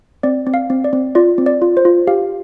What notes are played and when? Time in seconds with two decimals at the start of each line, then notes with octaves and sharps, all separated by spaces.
0.23 C4 D5
0.47 C4
0.54 F5
0.70 C4
0.84 D5
0.93 C4
1.15 F4 D5
1.38 C4
1.46 D5
1.62 F4
1.77 C5
1.85 F4
2.07 G4 F5